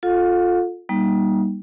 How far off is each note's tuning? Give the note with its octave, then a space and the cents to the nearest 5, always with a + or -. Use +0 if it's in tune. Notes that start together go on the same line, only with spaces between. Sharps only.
F4 +15 A4 -5 F5 +45
G3 +0 A#3 +40 D#4 +0